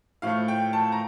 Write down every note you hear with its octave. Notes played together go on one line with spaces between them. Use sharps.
A2 F3 A3 F5
G5
A5
A#5